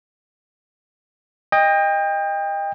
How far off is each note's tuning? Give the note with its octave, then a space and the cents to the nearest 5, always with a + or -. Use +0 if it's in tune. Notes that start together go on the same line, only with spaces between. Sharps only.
D#5 +0 G5 +30